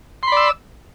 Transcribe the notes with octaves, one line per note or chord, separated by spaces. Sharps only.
D5 B5 C6 E6